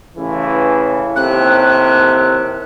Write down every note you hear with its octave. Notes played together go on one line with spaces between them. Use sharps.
A1 C#3 E3
D#2 A2 C3 F#6